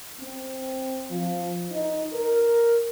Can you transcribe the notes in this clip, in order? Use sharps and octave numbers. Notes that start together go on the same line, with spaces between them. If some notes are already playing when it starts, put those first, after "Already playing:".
C4
F3
D#4
A#4